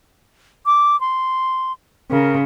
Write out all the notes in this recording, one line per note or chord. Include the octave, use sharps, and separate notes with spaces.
D6
C6
C#3 A#4